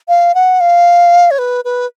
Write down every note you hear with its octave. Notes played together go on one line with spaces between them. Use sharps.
F5
F#5
F5
C#5
B4
B4